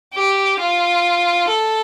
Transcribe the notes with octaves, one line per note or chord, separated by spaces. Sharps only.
G4
F4
A4